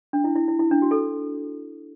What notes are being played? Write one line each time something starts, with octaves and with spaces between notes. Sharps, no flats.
D4
E4
E4
E4
E4
D4
F#4
A4